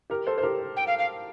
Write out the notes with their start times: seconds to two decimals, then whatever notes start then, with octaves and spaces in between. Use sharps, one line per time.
0.10 G4 A#4
0.27 A4 C5
0.38 C5
0.43 G4 A#4
0.76 G5
0.87 F5
0.98 F5